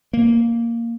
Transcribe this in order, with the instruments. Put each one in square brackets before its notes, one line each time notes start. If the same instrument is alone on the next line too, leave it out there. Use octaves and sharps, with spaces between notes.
[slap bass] A#3